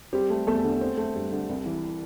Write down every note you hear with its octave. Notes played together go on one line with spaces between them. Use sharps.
G3 C4 G4
A3
E2 A3 A4
D3
C4
A3
G2
D3
C2
E3